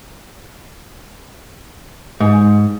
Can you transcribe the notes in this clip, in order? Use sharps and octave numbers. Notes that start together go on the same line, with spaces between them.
G#2